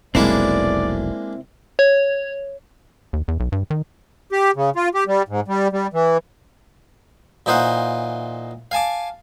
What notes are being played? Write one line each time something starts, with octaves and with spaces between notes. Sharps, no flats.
F1 B1 G#3 A#3 C4 D4 E4 D5
C#5
D#2
E2
B1
G2
D#3
G4
C#3
F4
G4
G3
G#2
G3
G3
E3
A#2 E3 D#4 C5 F5 F#5
F5 G#5 A5 D6